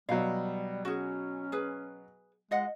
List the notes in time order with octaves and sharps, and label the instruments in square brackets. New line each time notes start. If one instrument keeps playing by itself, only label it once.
[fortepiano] B2 F#3 [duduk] G3 [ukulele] F5
[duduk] C#4 [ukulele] F#4 G#4
[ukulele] G#4 B4
[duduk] G#3 [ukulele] F4 D#5 F#5